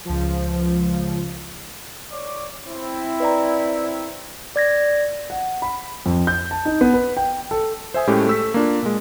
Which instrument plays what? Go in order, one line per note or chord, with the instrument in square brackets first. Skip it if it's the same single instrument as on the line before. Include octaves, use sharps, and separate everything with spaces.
[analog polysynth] C#2 F3
[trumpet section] C#5 D5 D6
C4 E4
[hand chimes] B4 D5 A#5
[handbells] D5 G#6 A#6
[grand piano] F#5
B5
F2
G6
A5
D#4
B3
B4
G5
A4
[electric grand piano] C5 E5 G#5 D#6
A2 G#3 A3 C#4 G4
A3 E6 B6
A#3 D4 F4
A#2 G#3